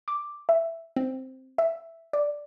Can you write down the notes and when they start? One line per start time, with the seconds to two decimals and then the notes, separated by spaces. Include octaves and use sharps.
0.08 D6
0.49 E5
0.96 C4
1.58 E5
2.13 D5